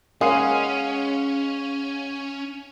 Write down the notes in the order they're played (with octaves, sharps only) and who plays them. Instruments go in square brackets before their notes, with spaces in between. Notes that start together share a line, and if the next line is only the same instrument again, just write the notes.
[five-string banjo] G#3 [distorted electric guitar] C#4 [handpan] A#4 C#5 [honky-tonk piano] F5 F#5 C7